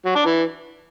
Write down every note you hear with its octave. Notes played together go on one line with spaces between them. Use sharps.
F#3
D4
E3